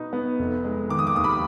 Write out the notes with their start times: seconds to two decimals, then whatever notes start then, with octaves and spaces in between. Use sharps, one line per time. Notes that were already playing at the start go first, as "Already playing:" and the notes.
Already playing: B2 D#4 B4
0.13 B3
0.39 F1
0.65 G#3
0.89 D#3 D6
0.99 D#6
1.07 D6
1.15 D#2 D#6
1.24 B5 D6